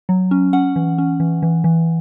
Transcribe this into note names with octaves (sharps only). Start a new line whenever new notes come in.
F#3
C#4
C#4 F#5
E3
C#4
E3
E3
E3